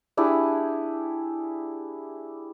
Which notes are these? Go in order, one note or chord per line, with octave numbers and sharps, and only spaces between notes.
D4 E4 G4 G#4